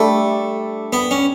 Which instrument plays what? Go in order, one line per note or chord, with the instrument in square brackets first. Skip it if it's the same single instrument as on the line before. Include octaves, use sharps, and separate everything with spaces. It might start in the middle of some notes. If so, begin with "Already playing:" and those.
Already playing: [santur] G3 D4 A4 E5 [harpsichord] A3
[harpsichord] B3
C#4